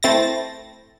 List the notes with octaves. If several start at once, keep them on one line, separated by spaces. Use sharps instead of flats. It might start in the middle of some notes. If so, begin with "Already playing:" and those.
A3 C4 E4 A6 A#6